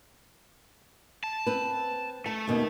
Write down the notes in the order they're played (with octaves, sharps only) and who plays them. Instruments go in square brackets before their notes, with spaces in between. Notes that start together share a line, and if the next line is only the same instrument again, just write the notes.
[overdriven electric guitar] A5
[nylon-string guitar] C4 B4
[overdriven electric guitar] A3 [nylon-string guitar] A5
[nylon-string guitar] D#2 B2 D#3